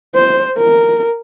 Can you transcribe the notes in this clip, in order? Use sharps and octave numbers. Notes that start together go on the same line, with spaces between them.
C5
A#4